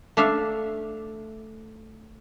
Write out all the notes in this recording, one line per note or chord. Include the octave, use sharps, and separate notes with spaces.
A3 D4 E5 F5